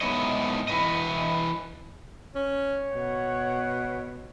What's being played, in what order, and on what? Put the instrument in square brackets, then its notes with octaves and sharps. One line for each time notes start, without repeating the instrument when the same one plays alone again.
[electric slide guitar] G#2 B3 D#4 E4 C#5 D#5
E3 E4 B4 D#5
[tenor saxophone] C#4 [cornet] C#5
[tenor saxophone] B2 [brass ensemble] F#5